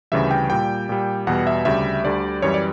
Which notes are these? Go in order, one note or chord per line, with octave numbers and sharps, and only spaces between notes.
D2 C#3 E3 G3 E5
G5
A#2 G3 G5
A#2 G3
E2 B2 G3 F#5
E5
D2 C#3 G3 E5
D2 D3 G3 D5
F#2 E3 G3 C#5
D5